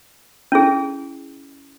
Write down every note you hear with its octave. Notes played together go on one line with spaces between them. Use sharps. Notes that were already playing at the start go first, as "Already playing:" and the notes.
C#4 E4 G#4